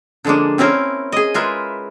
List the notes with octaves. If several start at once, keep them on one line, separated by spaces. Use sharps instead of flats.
D3 F3 G#3 A#3 D4
C4 C#4 E4 A#4 C5
G#4 D#5
G#3 E4 F4 A#4 B4 E5